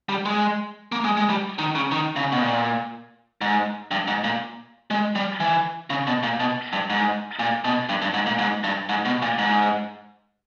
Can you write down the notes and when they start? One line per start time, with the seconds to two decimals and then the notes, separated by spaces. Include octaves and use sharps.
0.09 G3
0.26 G#3
0.92 A#3
1.04 G#3
1.17 G#3
1.30 G3
1.59 D#3
1.75 C#3
1.92 D#3
2.16 C#3
2.32 B2
2.41 A#2
3.41 G#2
3.91 G2
4.08 G#2
4.24 A#2
4.91 G#3
5.15 G3
5.40 E3
5.90 C#3
6.07 B2
6.23 A#2
6.40 B2
6.73 G2
6.90 G#2
7.39 A#2
7.64 B2
7.89 G2
8.02 G2
8.14 G#2
8.27 A#2
8.39 G#2
8.64 G2
8.89 G#2
9.05 B2
9.22 A#2
9.39 G#2